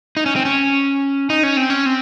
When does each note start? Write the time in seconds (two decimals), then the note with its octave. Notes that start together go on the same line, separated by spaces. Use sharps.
0.17 D#4
0.26 C#4
0.36 C4
0.45 C#4
1.30 D#4
1.43 C#4
1.57 C4
1.70 C#4
1.86 C4